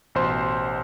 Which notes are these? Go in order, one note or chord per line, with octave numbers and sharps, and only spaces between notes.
A1 B2 C5 C6